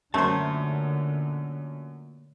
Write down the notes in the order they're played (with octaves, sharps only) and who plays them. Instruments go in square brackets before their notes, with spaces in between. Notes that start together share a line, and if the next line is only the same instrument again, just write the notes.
[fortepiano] F#2 [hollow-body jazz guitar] A#2 A5 [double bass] D3 [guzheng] A3 C5